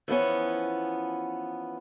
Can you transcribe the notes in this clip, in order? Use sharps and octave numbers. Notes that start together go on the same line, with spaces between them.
E3 F3 B3 C#4